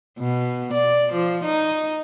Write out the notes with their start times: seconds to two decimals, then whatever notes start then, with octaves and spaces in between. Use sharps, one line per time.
0.19 B2
0.73 D5
1.12 F3
1.44 D#4